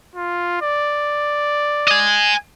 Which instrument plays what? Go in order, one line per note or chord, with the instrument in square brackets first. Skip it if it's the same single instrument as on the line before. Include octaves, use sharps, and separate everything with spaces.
[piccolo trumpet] F4
D5
[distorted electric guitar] D#5 G#5